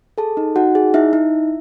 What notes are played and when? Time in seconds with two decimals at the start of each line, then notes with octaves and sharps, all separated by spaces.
0.18 G#4 A4 A5
0.37 D#4
0.56 D#4 F#4 F#5
0.75 G#4
0.94 D#4 E4 E5
1.13 D#4